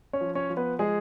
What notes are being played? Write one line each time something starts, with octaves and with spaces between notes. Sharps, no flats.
C#4 C#5
F3
C#4 C#5
F3
B3 B4
F3 G#3 G#4